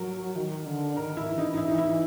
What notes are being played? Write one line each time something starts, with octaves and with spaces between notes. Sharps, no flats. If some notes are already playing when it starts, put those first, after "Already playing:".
Already playing: F#3 A#4
D#3
D3
D#3 A#4
E4
E3
D#4
D#4
E4
D#4
E4